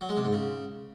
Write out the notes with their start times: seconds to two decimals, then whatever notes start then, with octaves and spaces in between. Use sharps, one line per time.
0.01 F#3
0.09 G#3
0.17 C3
0.25 G#2
0.33 C#3